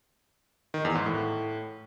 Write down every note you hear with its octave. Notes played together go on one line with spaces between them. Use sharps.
D#3
E2
G#2
A2